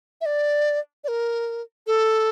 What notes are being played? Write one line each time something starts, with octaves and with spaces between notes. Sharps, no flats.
E5
D5
D5
A#4
A4